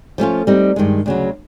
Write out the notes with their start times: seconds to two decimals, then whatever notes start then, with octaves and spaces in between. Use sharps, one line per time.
0.18 F3 A3 C#4 F4
0.47 G3 C4 D#4
0.76 G2 D#3 G#3
1.06 D2 C#3 F#3